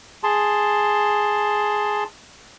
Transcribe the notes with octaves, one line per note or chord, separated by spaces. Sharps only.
G#4 A5 C6